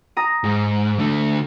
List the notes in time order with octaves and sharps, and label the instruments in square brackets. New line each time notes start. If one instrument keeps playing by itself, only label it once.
[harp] A#5 D#6
[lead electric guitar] G#2
D3 A3